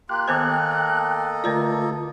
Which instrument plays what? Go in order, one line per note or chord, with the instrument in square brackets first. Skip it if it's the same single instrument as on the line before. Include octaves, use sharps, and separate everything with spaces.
[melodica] A#3 F4 G4 [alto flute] G5 [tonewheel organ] F#6
[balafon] D#3 B3 C5 [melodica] A#3 A4 D#5
[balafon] D3 A#4 D5 [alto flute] A3 [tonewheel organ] F4